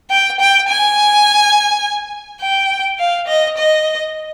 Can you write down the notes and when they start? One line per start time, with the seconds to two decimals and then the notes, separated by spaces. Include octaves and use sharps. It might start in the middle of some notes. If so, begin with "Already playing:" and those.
0.10 G5
0.40 G5
0.69 G#5
2.42 G5
2.99 F5
3.28 D#5
3.58 D#5